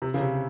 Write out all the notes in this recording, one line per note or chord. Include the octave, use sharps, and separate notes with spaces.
C3
C#3
C3